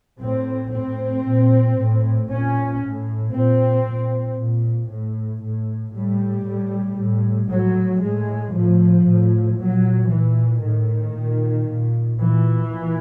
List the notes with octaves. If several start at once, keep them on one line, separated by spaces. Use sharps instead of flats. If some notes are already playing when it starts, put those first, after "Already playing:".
A2 C4
A2 C4
A#2
A2
A#2 C#4
A2
A#2 C4
A#2
A#2
A2
A2
A2 G3
A2
A2
A2 F#3
A2 G#3
A2 F3
A2
A#2 F#3
A#2 E3
A2 D#3
A#2
A#2
A#2 E3
A#2